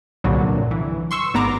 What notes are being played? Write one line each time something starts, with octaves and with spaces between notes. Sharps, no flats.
C2 G2 A#2 D3 F#3
E3
C6 C#6 E6
G#1 B3 A#5 D6